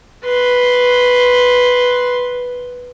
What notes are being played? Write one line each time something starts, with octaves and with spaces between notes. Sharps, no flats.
B4 C6